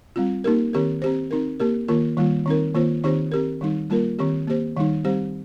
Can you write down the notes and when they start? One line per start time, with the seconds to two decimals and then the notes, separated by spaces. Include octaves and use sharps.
0.16 G3 C4 F4
0.44 A#3 D#4 G4 A#4
0.73 D#3 C4 G4 A#4
1.02 C4 G4 C5
1.31 C4 D#4 A#4
1.60 A#3 G4 A#4
1.88 D#3 A#3 F4 A#4
2.17 D#3 G3 A#3 F4
2.46 D#3 C4 D#4 A#4
2.75 D#3 A#3 F4 C5
3.04 D#3 C4 D#4 G4 C5
3.32 C4 G4 A#4
3.61 D#3 G3 D#4
3.90 G3 A#3 F4 A#4
4.19 D#3 C4 G4
4.47 A#3 G4 C5
4.76 D#3 G3 D#4
5.05 G3 C4 G4 C5